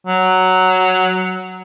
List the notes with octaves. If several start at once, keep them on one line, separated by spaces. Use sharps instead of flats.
F#3